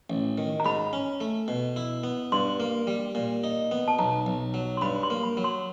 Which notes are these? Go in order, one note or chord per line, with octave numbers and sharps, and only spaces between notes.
A1
D#3
A#5
G#2 B5
C#4
A3
B2
E4
B3
G2 C6
A#3
G3
A#2
D#4
B3
A5
B1 A#5
B1
F#3
C6
G2 B5
C6
A#3
B5
F#3
C6